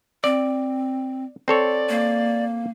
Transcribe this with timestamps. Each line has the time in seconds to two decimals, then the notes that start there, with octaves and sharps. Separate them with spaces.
0.24 C4 D5
1.48 C4 A4 C#5 D5
1.89 A#3